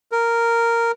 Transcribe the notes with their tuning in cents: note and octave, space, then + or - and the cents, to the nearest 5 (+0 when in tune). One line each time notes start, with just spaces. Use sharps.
A#4 -5